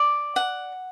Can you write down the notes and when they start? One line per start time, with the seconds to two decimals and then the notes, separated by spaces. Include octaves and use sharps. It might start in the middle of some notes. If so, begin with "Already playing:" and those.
Already playing: D5
0.36 F#5